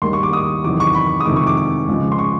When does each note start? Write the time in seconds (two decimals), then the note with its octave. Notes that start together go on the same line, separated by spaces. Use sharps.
0.02 D#2 D#3 G3 A#3 C6
0.13 C#6
0.23 D6
0.33 D#6
0.64 E2 C3 D#3 F#3 D6
0.80 C#6
0.94 B5
1.20 D#6
1.26 F2 C3 D#3 G#3 D6
1.36 C#6
1.47 D6
1.57 D6
1.88 C#2 C#3 F3 G#3
2.12 C6
2.19 C#6